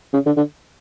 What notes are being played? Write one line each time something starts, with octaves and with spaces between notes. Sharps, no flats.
C#3
D3
D3